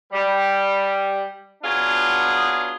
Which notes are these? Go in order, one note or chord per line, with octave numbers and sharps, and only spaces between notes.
G3
F#3 B3 D4 F4 G#4